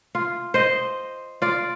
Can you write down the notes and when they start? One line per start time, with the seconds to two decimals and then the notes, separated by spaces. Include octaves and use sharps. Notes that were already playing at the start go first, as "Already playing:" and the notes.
0.15 F4
0.54 C5 D#5
1.42 F4 D5